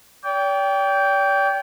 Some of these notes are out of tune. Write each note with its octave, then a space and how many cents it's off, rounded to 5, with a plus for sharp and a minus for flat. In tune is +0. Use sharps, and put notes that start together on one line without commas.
D5 -45 G5 +0